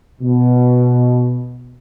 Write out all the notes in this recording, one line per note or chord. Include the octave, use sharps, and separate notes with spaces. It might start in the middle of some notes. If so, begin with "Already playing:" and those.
B2